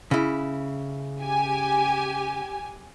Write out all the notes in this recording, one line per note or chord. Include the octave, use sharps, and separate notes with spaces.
C#3 E4
G4 G#5